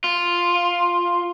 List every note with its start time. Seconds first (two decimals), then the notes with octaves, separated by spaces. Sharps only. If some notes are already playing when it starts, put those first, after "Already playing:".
0.04 F4